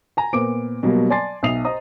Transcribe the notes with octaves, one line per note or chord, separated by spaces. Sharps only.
G#5 A#5
A#2 B3 C5 D6 D7
B2 F#3 G3 A#3
D5 G#5 A5 C6 A6 C7
B1 E5 D#6 C7 F7
C5 D#5 A#5 D#6